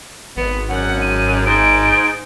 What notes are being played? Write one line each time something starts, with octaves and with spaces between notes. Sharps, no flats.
G#1 B3
F#2 F#5
D#7
G#2 D7